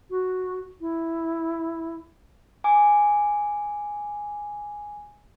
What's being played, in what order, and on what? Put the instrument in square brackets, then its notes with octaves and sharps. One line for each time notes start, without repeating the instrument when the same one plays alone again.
[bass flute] F#4
E4
[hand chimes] G#5 D6